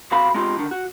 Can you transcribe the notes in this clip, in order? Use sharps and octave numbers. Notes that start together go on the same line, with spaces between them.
B1 C3 F#4 F5 B5
G#3 C4 D#4 F4 G4
D3 D#3
F#4